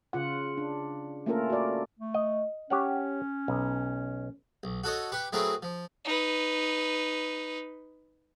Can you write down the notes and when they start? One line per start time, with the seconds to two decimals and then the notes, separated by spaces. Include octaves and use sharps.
0.13 C#3 F4 F#5
0.57 D4
1.26 A3 A#3 C#4 F4 A4 A#4
1.50 F#4 D5
1.99 A3
2.14 D#5
2.70 C#4 G4 C#5 F#5
3.48 B1
4.63 B1
4.84 F#4 A4 C#5 D#5
5.12 G4 B4 C#6
5.32 F#3 A3 C4 E4 G#4 A#4
5.63 F3
6.05 D#4 B4